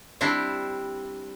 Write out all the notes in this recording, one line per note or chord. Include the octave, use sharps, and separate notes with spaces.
G3 C4 D4 E4 G4